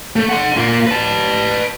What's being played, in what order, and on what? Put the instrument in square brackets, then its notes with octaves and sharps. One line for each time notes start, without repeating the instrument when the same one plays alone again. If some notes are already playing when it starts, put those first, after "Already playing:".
[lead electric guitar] A3
F#5 C6
A#2 A#3
B4 A5